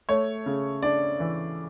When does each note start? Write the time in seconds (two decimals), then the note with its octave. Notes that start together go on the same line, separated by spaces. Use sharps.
0.09 A3 C#5
0.46 C#3
0.83 D4 D5
1.20 E3